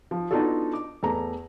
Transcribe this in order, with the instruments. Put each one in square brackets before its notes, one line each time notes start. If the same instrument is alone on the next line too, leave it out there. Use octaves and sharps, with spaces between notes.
[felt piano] F3
B3 D4 D#4 F4 F#4 A4
D6
E2 A3 A#5